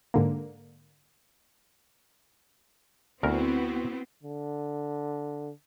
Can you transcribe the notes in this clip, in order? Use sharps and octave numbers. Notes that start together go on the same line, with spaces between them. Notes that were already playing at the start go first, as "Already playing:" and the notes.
G#2 D3 A#3
D2 B3 C4 E4 F#4 A#4
D3